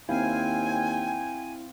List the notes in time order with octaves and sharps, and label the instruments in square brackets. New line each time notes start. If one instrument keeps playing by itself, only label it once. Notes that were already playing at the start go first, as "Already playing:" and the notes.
[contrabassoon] D#2 [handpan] C4 F5 [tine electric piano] E4 [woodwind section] G5 G#5